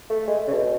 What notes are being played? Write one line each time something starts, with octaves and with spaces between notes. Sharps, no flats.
A3
G#3
C#3
B2